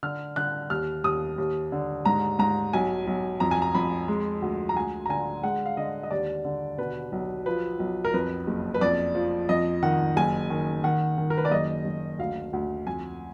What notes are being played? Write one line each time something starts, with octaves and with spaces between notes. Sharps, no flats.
D3 F6
D3 F#6
D#2 F6
D#2 D#6
D#2
D3
G#2 A#5
G#2 A#5
B1 G#5
B1
F2 A#5
G#5
A#5
F2 B5
G#3
D2
A#5
D2 G#5
A#5
D3 G#5
G#3 F#5
F5
D3 D#5
D#5
D#2 D5
D3
B2 B4
B1
F3 B4
B1
A#4
F2 B4
F#1
B4
F2 D5
F3
F2 D#5
D#3 F#5
F#1 G#5
D#3
D#3 F#5
D#3
A#4
B4
D5
F#1 D#5
F#1
D2 F5
D2
F2 G#5